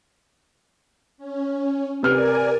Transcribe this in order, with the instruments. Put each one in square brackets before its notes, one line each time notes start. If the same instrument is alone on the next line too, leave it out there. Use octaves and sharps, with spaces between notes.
[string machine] C#4
[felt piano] C3 B4 F6 [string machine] A#4 D5 G#5